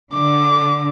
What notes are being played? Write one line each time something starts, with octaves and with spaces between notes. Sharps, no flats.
D3 D6